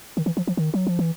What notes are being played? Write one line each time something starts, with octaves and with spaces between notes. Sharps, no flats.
D#3
E3
F3
F3
D#3
F#3
F3
E3